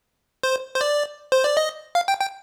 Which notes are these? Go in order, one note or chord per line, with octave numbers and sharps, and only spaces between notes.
C5
C5
D5
C5
D5
D#5
F5
G5
G5